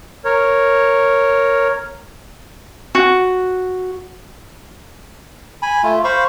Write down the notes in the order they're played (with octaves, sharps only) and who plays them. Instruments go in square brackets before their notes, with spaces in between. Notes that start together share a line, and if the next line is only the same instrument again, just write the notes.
[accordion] A#4 C#5
[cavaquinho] F#4
[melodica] G#5 B5
A3 F4
C5 F5 B5 C#6